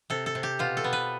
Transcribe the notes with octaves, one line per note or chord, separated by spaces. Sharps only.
C3 A4
A4
C3
G4
B2 F4
A4
B3
B4